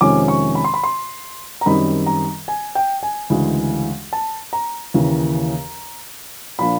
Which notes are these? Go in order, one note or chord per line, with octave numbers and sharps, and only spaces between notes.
F2 C3 D#3 G#3 C#4 D6
C#6
B5
C6
B5
C6
A#5
F#2 D#3 G3 C4 D#4 B5
A#5
G#5
G5
G#5
D2 C#3 E3 G#3
A5
A#5
D#2 C#3 E3
A#2 F3 A#3 D4 B5